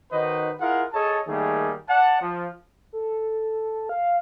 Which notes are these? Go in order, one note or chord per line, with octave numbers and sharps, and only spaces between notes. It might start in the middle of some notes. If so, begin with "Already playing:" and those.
D#3 D#4 F#4 B4 C5 D#5
E4 F4 G#4 A#4 F5 F#5
G#4 A4 C#5 D#5 A5
D#3 G3 A3 A#3 G#4
D5 F#5 A5
F3
A4
F5